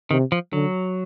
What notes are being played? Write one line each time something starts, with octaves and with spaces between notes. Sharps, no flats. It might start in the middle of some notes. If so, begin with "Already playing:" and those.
C3 D#3
F3
D3 F#3